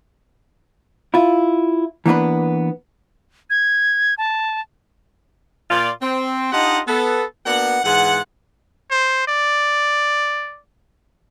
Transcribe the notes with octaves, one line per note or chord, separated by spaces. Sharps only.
E4 F4
E3 A#3 B3 D4 B4
G#6
A5
A#2 F4 D5
C4
D4 D#4 F4 G4 D#5 F#5
B3 A4
A#3 B3 D4 F#4 F#5
G#2 E3 F4 G#4 F#5
C5
D5